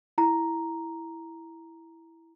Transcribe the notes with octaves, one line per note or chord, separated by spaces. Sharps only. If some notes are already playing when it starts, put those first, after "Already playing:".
E4 A#5